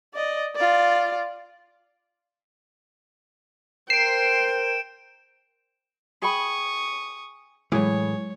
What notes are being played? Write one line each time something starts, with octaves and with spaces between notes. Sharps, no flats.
D5 D#5
F4 D5
A#4 C5 G5 C7 D7 E7
G#4 G5 B5 C#6 D#6
A2 E3 F#3 G#3 G#4 C#5